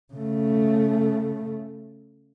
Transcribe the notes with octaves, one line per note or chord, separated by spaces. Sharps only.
C#3 A3